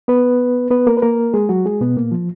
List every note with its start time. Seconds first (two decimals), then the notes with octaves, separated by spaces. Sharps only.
0.08 B3 B4
0.71 B3 B4
0.87 A#3 A#4
0.97 B4
1.02 A#3 A#4
1.34 G#3 G#4
1.49 F#3 F#4
1.66 G#3 G#4
1.81 B2 B3
1.97 A#2 A#3
2.12 F3